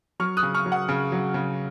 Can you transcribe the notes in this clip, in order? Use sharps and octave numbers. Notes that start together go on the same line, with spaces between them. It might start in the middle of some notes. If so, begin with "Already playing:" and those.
F#3 C#6 F6
D#6 F#6
C#3
C#6 F6
F#3
F#5
C#3
F#3
C#3